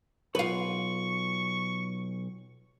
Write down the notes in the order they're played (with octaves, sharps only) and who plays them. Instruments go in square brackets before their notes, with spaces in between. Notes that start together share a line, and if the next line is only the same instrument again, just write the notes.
[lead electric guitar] B1 [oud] F4 B4 [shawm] C#6